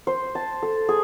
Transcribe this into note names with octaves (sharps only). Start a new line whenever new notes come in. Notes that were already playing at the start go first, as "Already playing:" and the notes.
C5
A5
A4
G#4